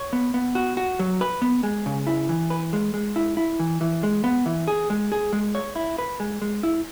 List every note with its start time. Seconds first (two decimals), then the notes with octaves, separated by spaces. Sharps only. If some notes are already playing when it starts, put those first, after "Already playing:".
Already playing: C#5
0.13 B3
0.34 B3
0.55 F#4
0.77 F#4
0.99 F#3
1.21 B4
1.42 B3
1.63 G#3
1.86 C#3
2.07 E4
2.29 E3
2.50 B4
2.73 G#3
2.94 G#3
3.16 E4
3.37 E4
3.59 E3
3.81 E3
4.03 G#3
4.24 B3
4.46 E3
4.68 G#4
4.90 G#3
5.12 G#4
5.33 G#3
5.55 C#5
5.76 E4
5.98 B4
6.20 G#3
6.42 G#3
6.63 E4